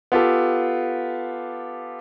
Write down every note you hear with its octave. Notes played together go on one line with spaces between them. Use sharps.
B3 F4 G4 A4